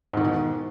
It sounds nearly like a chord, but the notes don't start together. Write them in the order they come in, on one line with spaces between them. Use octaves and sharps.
G#2 D#3 B2 E3